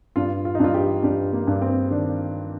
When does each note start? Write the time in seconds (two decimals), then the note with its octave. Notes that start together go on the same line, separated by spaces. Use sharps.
0.16 G2 F4
0.45 F4
0.55 D#4
0.60 G2 F4
0.74 G4
1.03 G2 G4
1.33 A#3
1.47 G2
1.62 C4
1.91 D#3 D4